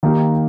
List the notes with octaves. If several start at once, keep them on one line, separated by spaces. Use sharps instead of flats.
D#3 A#3 D#4 G4